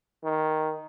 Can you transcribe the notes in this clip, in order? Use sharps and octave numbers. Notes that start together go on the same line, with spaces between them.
D#3